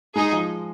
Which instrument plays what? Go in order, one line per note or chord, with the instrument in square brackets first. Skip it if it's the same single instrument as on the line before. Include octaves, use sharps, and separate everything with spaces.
[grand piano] G#3 [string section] D#4 G#4
[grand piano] F3